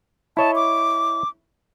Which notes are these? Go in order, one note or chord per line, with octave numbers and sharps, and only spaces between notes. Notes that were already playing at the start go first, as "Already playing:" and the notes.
E4 C#5 D#5 A5
D6